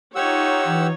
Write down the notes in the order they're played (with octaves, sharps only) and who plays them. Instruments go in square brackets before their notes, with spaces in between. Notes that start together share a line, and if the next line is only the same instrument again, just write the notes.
[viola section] D#4 F4 C#5 [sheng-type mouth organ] G4 F#5 E6
[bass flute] E3